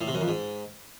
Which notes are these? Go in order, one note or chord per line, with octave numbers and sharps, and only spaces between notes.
A2
C3
F#2
F2
G#2